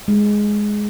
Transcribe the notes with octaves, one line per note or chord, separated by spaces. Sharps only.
G#3